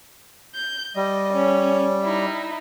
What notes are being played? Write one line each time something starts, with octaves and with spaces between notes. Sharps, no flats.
G6
G3 D#5
C#4
D#4 E4